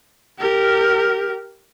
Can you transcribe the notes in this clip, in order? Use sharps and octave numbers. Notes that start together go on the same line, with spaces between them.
G4 A#4